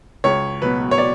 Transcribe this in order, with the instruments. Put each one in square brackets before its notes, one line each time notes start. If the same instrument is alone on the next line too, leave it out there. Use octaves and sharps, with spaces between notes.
[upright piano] C#2 C#5
B2 F#3 B4
C#5
D5